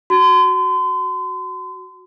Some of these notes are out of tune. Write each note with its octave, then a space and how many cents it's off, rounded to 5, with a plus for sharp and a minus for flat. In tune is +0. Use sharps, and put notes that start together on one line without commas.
F#4 +0 C6 -40